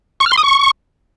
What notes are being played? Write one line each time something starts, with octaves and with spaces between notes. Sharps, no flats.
C#6
F6
C6
D#6
C#6